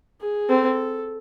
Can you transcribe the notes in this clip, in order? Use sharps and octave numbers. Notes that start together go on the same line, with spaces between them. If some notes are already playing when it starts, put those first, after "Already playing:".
G#4
C4 A4